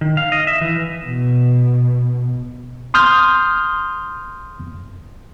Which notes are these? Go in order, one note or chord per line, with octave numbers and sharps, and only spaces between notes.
D#3
F5
D#5
E5
E3
B2
C6 D#6 F6 G6